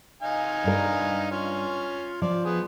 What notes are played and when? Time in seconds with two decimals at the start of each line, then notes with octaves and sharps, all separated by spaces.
0.23 D#4 F5 G#5
0.64 G2 A#4
1.31 C#4 F4
2.22 F3 D5
2.44 B3 G#4